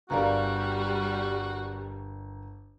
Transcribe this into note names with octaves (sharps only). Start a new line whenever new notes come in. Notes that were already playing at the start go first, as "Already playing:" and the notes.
G1 G3 F#4 A#4 D5 F5 A#5